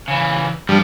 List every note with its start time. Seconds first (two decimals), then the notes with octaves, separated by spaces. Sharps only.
0.08 C#3 E3
0.69 G2 F3